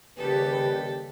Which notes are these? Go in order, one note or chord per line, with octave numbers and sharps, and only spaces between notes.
D#2 C#3 G3 G4 A4 B4